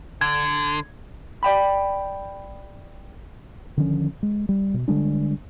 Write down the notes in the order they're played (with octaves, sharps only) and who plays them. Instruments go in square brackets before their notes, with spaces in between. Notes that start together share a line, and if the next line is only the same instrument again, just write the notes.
[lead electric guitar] D3 [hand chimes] G#6
[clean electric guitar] D5 G5 B5
[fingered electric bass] D3 D#3 F3 C#4
G#3
G3
B2
D3 G3 G#3 D4